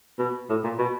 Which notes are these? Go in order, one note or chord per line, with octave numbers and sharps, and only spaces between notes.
B2
A2
A#2
B2